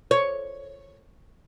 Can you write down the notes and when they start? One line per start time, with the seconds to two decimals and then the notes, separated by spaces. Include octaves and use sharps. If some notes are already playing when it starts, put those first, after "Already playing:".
0.11 C#5